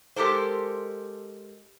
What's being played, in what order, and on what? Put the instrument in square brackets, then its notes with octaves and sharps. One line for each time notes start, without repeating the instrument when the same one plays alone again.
[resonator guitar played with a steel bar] G#3 G4 A4 A#4 C5